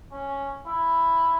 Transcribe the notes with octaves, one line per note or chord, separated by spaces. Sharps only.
C#4
E4